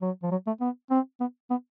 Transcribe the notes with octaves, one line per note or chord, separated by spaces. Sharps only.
F#3
F3
F#3
A3
B3
C4
B3
B3